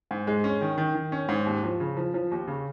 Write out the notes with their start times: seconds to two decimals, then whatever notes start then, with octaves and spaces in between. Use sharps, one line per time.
0.11 G#2
0.27 G#3
0.44 C#4
0.61 D#3
0.78 D#3
0.95 D#3
1.12 C#4
1.29 G#2
1.46 D#2
1.64 F3
1.80 C#3
1.97 F3
2.14 F3
2.31 D#2
2.47 C#3